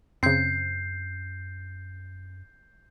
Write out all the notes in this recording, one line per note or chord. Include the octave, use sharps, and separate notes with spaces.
F#2 C#3 C4 G6 C7